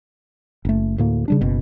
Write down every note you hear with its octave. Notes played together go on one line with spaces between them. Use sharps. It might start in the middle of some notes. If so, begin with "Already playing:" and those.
F#1 A3
D2 A2 A#3
C#3 G3 D4
F#1 B2